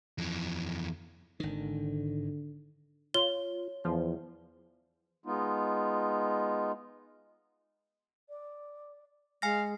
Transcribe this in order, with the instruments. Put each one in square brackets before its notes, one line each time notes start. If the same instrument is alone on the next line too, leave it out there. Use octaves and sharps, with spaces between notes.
[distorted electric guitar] F2 E3
[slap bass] G#1 D#3 [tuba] D3
[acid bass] F4 [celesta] C#5 [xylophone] G7
[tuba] E2 [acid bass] F3
[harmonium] G#3 B3 D#4 F4
[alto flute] D5
[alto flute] G#3 [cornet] F5 [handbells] G#5 A#6